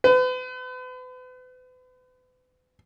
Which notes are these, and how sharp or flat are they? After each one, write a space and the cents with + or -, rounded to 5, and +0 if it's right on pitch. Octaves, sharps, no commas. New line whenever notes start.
B4 +40